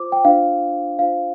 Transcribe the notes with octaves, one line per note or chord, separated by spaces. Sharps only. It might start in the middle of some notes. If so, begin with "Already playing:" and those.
Already playing: F4 C5 D6
G5
D4 F4 C5 F5
D4 F4 C5 F5